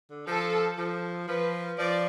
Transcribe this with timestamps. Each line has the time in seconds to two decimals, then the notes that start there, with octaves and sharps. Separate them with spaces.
0.10 D3
0.27 F3 A4
0.78 F3
1.27 F3 B4
1.78 F3 D5